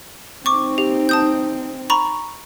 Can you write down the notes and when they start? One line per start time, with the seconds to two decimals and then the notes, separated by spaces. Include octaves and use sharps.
0.46 C4 D#4 C#6 D6
0.78 G4
1.09 A5 D#6 G6
1.90 A#5 B5 C#6